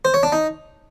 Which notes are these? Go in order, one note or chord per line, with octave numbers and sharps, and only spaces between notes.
C5
C#5
D4
D#4